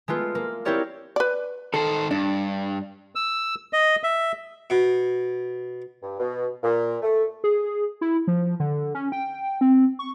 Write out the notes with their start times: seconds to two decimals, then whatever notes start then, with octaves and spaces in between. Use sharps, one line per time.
0.08 G#3 A3 B3 F4
0.35 A#3
0.65 C4 E4 G4 A#4 C#5 D5
1.16 B4 D5
1.74 D#3 A4 C5
2.11 G2 D4
3.15 E6
3.73 D#5
4.03 E5
4.70 B2
6.03 G2
6.19 B2
6.63 A#2
7.02 A3
7.44 G#4
8.01 E4
8.27 F3
8.60 D3
8.95 C#4
9.12 G5
9.61 C4
9.99 C#6